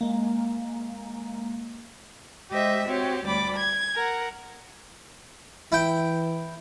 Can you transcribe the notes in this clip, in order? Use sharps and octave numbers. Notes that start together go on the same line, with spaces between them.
G#3 A#3
G#3 G4 C5 D#5 E5
C4 F#4 G4 C#5
D2 G3 D5 B5 D6
G#6
A#4 F#5
E3 E4 G5